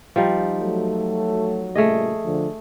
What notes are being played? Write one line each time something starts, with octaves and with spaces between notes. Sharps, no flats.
F3 G3 D#4
F#3 A3
A#2 C#3 G3 A3 G#4 D#5
D3 F3